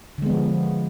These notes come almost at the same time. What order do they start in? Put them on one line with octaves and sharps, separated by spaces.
D3 G#3 B3 F3